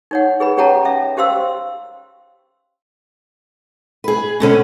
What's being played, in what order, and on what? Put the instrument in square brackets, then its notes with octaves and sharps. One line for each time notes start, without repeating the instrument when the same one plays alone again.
[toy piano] D#4 C#5 F#5
G#4 B4 B5
C#4 G4 C#5 F#5 A5 A#5
C#4 E5
C#4 G4 C5 F5 C6 E6
[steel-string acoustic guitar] G#4 B4
B2 D3 C#4